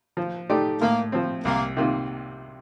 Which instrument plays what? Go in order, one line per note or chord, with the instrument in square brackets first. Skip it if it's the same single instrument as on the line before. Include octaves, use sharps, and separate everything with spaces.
[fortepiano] F3
A3 D#4 G4 D5
[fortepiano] A2 [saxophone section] A#3
[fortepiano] F3 C4
[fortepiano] C2 [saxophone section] A#3
[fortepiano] C3 D#3 A#3 F4